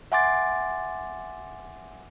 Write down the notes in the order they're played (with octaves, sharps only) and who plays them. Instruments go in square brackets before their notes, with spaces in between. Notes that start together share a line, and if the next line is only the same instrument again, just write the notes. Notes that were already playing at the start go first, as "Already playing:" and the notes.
[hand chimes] E5 F#5 G#5 C6 D6 A6